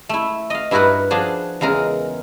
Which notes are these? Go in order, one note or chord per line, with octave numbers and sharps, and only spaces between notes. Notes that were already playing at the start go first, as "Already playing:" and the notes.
A3 E4
D#5 F5
G2 E4 F#4 A#4 B4 F#5
F3 D4 F#4 G#4
E2 C#3 G#3 A#4